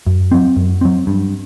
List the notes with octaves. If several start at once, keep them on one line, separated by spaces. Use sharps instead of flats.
F#2
F#3 C4
F#2
F#3 C4
G2